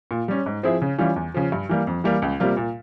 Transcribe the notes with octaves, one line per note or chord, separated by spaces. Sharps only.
A#2
G3 C#4
G#2
F3 C4 E4 G#4
C#3
E3 G3 C#4 F4
E2
C#3 F3
G2
E3 G3 A#3
F2
E3 G3 A#3
C#2
C3 G3 A#3 F4
A#2